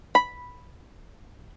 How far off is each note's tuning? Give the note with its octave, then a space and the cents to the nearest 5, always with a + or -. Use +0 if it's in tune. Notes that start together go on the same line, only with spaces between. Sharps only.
B5 -5